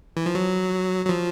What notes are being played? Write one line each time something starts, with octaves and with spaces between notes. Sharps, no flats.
E3
F3
F#3
F#3
F3